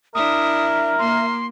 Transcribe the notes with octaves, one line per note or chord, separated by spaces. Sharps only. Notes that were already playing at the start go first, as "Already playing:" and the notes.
D4 E4 A#4 E5 D#6
A#3 C6